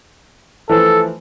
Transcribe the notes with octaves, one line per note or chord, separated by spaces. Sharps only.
E3 F3 A3 A4